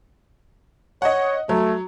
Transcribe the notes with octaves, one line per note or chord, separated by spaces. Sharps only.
C#5 D#5 F#5
F#3 A3